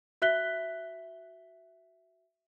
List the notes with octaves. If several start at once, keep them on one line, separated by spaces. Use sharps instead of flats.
F#4 E5 F#6 B6 G7